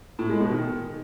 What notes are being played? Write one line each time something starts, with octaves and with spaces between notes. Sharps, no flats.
A2
G#3
B2
D#3